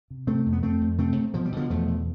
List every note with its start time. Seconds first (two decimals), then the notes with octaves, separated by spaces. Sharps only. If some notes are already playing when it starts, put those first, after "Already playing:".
0.10 C3
0.27 C3 A3 C4
0.46 F2
0.53 B3
0.62 F2 A3 C4
0.81 F2
0.98 C3 A3 C4
1.16 C3
1.34 B2 F3
1.45 G3
1.52 B2 D3 F3
1.70 E2 F3 A3
1.88 B2